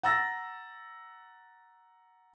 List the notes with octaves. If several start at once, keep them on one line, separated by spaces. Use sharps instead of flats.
F#5 A#5 E6 A6 A#6